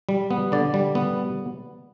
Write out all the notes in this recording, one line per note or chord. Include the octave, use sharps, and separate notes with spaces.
G3
B3
D3 D5
G3
B3